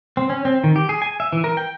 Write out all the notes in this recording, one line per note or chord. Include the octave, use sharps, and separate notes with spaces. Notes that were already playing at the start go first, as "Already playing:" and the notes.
C4
C#4
C4
D#3
G4
G#4
G#5
E5
E3
A#4
G5